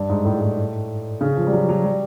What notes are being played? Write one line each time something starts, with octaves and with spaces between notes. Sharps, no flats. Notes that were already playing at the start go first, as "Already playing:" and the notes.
Already playing: G2
G#2
A2
A2
C#3
F3
G3
F#3
F#3
G3